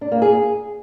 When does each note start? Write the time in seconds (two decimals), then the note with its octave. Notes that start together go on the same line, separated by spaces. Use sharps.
0.01 D4
0.12 A#3
0.22 G#4